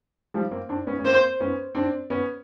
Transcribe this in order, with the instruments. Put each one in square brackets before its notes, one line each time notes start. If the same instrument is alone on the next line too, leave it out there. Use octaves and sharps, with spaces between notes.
[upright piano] F3 G3
A#3 C4
C4 D4
B3 C#4
C#4
[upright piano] A#3 C4 [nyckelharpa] C5
[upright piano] B3 C#4
C4 D4
B3 C#4